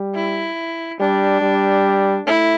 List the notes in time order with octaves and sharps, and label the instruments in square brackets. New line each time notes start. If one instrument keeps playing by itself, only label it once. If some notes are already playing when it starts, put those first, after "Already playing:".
Already playing: [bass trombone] G3
[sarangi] E4
[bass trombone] G3 [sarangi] D4
[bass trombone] G3
[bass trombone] A3 [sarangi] E4